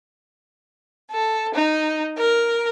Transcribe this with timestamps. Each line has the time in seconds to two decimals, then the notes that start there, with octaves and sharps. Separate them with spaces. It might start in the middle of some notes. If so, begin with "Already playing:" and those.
1.11 A4
1.53 D#4
2.18 A#4